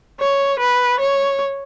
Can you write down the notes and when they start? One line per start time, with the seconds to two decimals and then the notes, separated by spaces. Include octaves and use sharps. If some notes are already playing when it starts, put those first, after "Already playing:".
0.20 C#5
0.60 B4
1.00 C#5